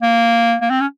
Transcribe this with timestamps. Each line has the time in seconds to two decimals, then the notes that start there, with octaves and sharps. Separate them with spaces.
0.02 A#3
0.61 A#3
0.70 C4
0.81 C#4